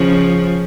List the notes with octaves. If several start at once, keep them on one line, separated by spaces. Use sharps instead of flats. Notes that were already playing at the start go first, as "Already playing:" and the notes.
Already playing: C#3 F3